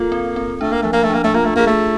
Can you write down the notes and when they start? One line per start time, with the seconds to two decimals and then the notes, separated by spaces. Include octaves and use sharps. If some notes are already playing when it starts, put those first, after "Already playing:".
Already playing: A#3 F4 A4
0.12 C4
0.36 C4
0.61 A3 D4
0.71 A#3
0.82 F3 A3
0.93 A#3
1.03 A3
1.10 A#3 D4
1.24 A3
1.34 A#3 F4
1.45 A3
1.56 A#3 G#4
1.66 A3